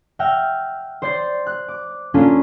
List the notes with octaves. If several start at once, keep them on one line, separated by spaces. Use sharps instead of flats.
E5 F#5 G5 F6 A#6
C5 D5 C6 G6 A6 C7
F#6
D6
A#3 C#4 D4 F4 A4